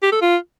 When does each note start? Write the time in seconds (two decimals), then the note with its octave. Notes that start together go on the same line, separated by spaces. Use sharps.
0.03 G4
0.12 A4
0.21 F4